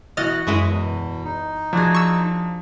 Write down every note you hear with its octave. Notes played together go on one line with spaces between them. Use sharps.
B2 E3 F#4 D#5 F6 F#6 A6
F#2 G#3 E4 C#6 D#6
E2 B2
D#4
F3 D4 F#4 G#4
C#6 E6